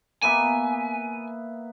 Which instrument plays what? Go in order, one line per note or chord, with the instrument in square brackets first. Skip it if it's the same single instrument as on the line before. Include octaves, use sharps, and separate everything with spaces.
[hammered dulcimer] A#3 B3 E5 [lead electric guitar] G#5